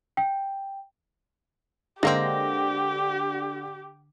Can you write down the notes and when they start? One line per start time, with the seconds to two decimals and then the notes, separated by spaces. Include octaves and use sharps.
0.17 G5
2.03 D3 G#3 A#3 C4 G4 A#6